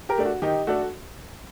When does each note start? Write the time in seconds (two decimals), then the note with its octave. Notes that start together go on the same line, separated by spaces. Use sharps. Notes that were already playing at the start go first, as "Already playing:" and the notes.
0.09 G4 A#4
0.18 A3 D4
0.25 F#4
0.42 D#3 D#4 G4
0.67 A3 D4 F#4 A4